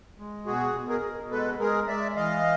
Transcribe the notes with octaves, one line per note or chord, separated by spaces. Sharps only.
G#3
B2 F#4 G#4
B2
G#4 A#4
B2
G#3 A4 B4
G#3 G#4 A#4
G#3 D5 E5
E3 D#5 F5